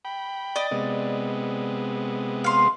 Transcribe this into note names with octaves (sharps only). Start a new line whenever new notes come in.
G5 B5
D5 D#5
C3 G#3 B3
F5 C6